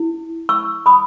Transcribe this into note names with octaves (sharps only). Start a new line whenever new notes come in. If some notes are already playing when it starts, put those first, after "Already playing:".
Already playing: E4
C#6 E6
B5 D#6